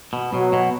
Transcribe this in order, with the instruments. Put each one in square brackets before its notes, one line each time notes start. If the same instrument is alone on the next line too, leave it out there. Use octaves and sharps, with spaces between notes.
[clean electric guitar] B2
[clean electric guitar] B2 [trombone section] F#3
[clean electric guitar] B2